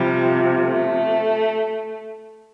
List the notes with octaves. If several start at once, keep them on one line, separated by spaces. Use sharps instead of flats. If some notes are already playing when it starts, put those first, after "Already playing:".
Already playing: C3 F3 G3
A3